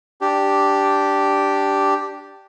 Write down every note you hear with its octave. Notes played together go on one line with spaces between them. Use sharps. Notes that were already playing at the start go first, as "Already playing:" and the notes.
D4 G4